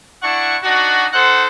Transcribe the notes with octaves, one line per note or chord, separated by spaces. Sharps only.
D4 E4 F#5 C#6
D4 D#4 F#4
D#4 A4 C5 F#5